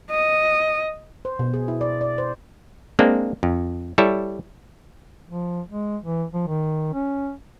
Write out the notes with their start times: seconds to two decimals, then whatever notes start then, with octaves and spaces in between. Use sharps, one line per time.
0.10 D#5
1.25 C5
1.39 B2
1.54 G#4
1.68 E4
1.81 D5
2.01 D5
2.18 C5
2.99 G#3 A#3 C4 D4
3.43 F2
3.98 G3 E4 A4 C#5
5.28 F3
5.70 G#3
6.03 E3
6.33 F3
6.47 D#3
6.93 C#4